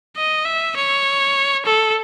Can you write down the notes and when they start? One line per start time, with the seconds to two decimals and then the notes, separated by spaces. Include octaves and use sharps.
0.17 D#5
0.45 E5
0.76 C#5
1.66 A4